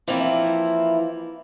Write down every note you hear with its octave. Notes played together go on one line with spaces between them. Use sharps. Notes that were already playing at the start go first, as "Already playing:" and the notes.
E3 F3 A#3 C4 E4